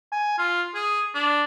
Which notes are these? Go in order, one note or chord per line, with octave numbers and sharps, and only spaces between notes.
G#5
F4
G#4
D4